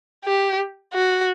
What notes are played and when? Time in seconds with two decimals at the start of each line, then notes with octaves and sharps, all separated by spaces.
0.25 G4
0.94 F#4